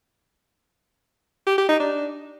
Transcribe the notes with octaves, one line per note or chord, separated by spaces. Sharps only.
G4
G4
D#4
D4